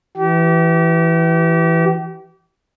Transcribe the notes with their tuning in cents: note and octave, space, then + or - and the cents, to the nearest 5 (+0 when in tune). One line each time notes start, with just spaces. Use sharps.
E3 +5 G4 -35